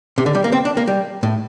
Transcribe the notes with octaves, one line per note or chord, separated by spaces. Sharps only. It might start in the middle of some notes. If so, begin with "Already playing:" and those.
C3
D3
G3
A#3
C4
D4
A#3
G3
A2